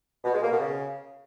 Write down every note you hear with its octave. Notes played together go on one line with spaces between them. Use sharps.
B2
G#3
A#3
B2
C#3